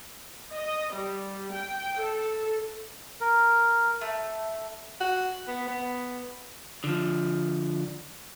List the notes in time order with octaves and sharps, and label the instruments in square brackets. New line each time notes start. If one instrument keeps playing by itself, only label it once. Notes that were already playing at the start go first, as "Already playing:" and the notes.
[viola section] D#5
G3
G5
A4
[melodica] A#4
[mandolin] A3
[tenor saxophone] F#4
B3
B3
[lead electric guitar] D3 F3